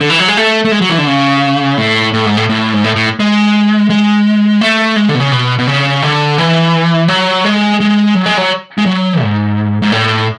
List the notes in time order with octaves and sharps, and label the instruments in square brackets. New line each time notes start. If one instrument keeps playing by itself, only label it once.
[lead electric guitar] D3
E3
F#3
G#3
A3
A3
G#3
F#3
E3
D3
C#3
A2
A2
G#2
A2
A2
G#2
A2
A2
G#3
G#3
A3
G#3
D3
B2
C#3
B2
B2
C#3
D3
E3
F#3
G#3
G#3
F#3
G#3
F#3
G#3
F#3
G#2
G#2
A2